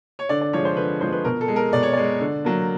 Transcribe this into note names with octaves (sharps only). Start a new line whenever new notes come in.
C#5
D3 D5
D5
F3 G#3 C#5
C5
D3 B4
F3 G#3 C5
B4
B2 A#4
A4
G#3
A#4
B2 D5
C#5
G#3 D5
D3
F#3 A#3